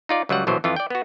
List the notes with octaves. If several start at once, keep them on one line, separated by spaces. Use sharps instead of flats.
D#4 F4 D5
C#2 F#3 G3 F#5
A#1 B2 E3 F#3 C5
F2 E3 F4
D5 G5
B3 F#4